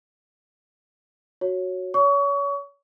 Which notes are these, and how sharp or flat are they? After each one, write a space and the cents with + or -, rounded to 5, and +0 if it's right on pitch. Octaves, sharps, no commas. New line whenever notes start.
F#4 -5 C#5 +0
C#5 +30 C#6 +30